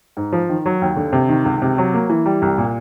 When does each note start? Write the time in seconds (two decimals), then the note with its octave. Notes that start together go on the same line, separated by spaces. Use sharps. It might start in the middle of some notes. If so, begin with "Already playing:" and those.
0.17 G#2
0.33 F3
0.49 D#3
0.66 F#3
0.82 D#2
0.97 D3
1.13 C3
1.29 D#3
1.45 C#2
1.62 C3
1.78 F#3
1.94 A#3
2.10 E3
2.26 G3
2.42 C2
2.58 A#2